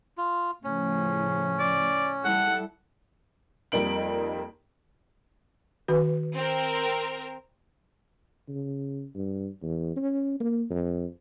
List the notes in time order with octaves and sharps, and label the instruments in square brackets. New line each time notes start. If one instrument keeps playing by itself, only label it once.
[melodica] F4
[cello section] A2 C#3 F3 [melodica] C#4
[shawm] D5
[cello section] G3 E4 A4 [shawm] F#5
[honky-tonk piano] F2 G3 A#3 D#4 D7 F#7
[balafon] D#3 F#4 B4
[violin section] C4 A#4
[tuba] C#3
G2
E2
C#4
A#3
F2